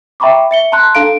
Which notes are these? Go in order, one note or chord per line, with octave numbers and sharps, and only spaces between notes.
E5 G5 A#5 B5 C#6 D6
E5 C#7 G7
A5 A#5 C6 F#6
D4 A4 F5 A#5 D7